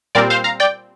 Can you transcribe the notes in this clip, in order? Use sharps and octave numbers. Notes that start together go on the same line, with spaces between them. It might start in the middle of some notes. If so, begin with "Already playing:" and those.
A#2 G3 C4 A#4 D5
C5 F5
F5 A#5
D5 G5